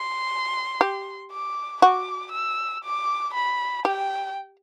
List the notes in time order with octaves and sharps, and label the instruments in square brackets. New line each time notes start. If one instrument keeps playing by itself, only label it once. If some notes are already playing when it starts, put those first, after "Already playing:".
Already playing: [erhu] C6
[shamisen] G4
[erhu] D6
[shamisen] F#4 [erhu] D6
[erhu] E6
D6
B5
[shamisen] G4 [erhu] G5